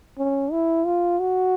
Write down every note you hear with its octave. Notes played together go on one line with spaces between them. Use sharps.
C#4
E4
F4
F#4